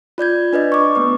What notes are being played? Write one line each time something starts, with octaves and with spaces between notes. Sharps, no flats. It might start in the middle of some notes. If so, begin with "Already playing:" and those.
F4 D5 G6 G#6
D4 B4 D5 D#5
C#6 D6
A3 B3 B4